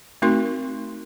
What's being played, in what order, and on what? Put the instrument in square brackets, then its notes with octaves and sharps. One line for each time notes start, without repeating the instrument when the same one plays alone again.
[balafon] A3 C4 D#4 F#4 A#4 C6